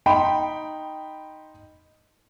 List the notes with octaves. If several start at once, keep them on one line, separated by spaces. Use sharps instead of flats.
D#4 G5 B5 C6